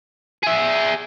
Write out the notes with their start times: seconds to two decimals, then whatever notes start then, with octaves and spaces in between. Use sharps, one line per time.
0.43 G#4 E5